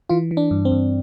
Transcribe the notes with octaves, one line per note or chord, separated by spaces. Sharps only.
E3 F4
E3
D4
G2
C4
G2